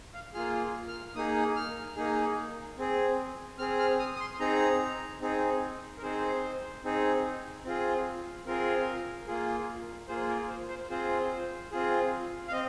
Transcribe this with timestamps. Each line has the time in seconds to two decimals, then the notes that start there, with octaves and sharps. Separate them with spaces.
0.14 F5
0.34 A#3 F4 G#4 F6
0.88 F6
1.15 A#3 D#4 G#4 D#6
1.56 F6
1.96 A#3 D#4 G#4
2.78 C4 G#4
3.59 C4 G#4 F6
3.79 F6
3.99 D#6
4.15 D#6
4.20 C6
4.40 C4 D#4 G#4 A#5
5.21 C4 D#4 G#4
5.98 A#4
6.02 C4 D#4 G#4 C5
6.84 C4 D#4 G#4
7.65 C4 F4 G#4
8.46 C4 F4 G#4 A#4
9.28 A#3 F4 G#4
10.08 A#3 F4 G#4 C5
10.29 A#4
10.49 C5
10.69 C5
10.90 C4 F4 G#4 C5
11.71 C4 F4 G#4
12.48 F5
12.52 C4 D#5